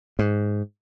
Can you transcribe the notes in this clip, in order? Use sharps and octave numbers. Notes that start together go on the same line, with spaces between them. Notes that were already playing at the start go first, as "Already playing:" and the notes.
G#2